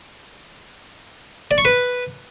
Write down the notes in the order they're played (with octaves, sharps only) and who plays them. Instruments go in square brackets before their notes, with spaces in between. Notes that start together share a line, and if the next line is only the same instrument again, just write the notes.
[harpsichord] D5
C#6
B4